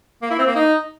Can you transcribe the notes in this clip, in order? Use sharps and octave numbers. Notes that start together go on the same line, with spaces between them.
A#3
E4
C4
A#3
D#4